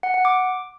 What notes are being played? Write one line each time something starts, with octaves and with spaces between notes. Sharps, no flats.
F#5
F#5
D6